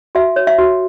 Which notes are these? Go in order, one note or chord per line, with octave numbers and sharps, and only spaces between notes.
F#4 E5
C#5
E5
F#4